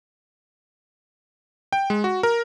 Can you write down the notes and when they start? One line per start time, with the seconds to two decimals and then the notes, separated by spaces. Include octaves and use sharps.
1.73 G5
1.90 G#3
2.04 F#4
2.23 A#4